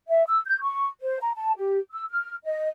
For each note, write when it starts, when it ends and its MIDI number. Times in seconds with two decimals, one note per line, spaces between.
0.09 0.23 76
0.28 0.40 88
0.45 0.60 91
0.61 0.86 85
1.01 1.18 72
1.21 1.31 82
1.35 1.52 81
1.57 1.78 67
1.92 2.05 88
2.10 2.36 89
2.45 2.67 75